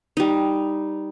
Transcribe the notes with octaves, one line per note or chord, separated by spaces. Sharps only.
G3 D#4